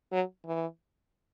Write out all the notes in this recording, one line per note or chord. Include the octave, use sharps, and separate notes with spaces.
F#3
E3